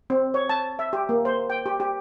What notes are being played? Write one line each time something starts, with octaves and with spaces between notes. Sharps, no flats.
C4
C#5
A5
E5
G4
A#3
C5
G5
G4
G4